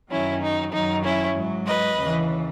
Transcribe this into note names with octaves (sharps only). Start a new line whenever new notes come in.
F#2 D#3 F#3 C#4 E4
D#4
F#2 D#3 F#3 D#4
C#4 E4
G#2 F#3
B4 D#5
D#2 C#3 E3